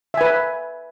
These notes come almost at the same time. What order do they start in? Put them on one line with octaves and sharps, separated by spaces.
E5 G#5 B4